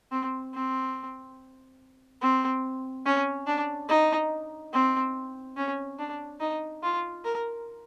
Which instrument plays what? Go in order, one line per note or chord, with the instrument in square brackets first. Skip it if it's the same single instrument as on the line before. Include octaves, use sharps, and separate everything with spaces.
[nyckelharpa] C4
C4
C4
C#4
D4
D#4
C4
C#4
D4
D#4
F4
A#4